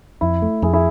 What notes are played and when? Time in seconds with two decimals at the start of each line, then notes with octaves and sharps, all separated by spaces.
0.21 F2 E4
0.42 A3
0.62 F2 E4 G#4
0.74 E4 G#4